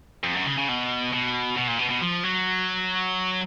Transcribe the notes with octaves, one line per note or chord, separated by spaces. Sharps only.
F2
F#2
C#3
C#3
B2
B2
B2
A#2
B2
B2
F3
F#3